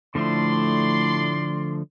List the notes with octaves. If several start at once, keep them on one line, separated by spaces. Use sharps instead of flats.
A2 D3 F3 A3 D5 C6